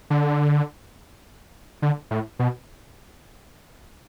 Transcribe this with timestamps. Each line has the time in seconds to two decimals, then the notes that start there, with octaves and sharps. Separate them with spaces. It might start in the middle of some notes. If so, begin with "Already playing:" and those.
0.10 D3
1.82 D3
2.11 A2
2.39 B2